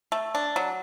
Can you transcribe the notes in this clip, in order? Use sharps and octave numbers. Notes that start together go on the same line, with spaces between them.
A3
D4
F#3